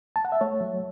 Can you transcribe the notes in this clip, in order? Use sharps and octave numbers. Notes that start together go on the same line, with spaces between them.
A5
F#5
E5
A3 C#5
F#3